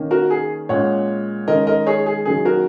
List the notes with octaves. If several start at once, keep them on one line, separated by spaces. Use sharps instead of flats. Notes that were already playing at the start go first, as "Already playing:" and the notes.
Already playing: D#3 A#3 C#4
F#4 A#4
G#4
A#2 G#3 C#4 C#5 F#5
D#3 G#3 C#4 A#4 D#5
A#4 D#5
G#4 C#5
G#4
D#3 F#3 A#3 C#4 G#4
F#4 A#4